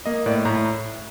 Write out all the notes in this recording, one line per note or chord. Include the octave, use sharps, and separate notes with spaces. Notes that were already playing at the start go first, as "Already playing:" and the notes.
A#3 D#5
A2 D5
A2 A#5